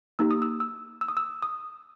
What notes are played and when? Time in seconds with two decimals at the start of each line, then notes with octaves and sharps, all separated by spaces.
0.19 A#3 D#4 G4 E6
0.31 D#6
0.42 E6
0.60 E6
1.01 E6
1.08 D#6
1.17 E6
1.42 D#6